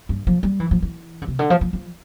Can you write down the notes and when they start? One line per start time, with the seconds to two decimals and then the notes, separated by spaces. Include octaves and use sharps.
0.09 G2
0.27 F3
0.43 G3
0.60 E3
0.71 F3
0.82 E3
1.22 D3
1.28 C3
1.39 D3
1.50 F3
1.61 F3
1.73 F3